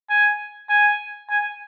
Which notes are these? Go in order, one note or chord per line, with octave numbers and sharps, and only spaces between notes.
G#5
G#5
G#5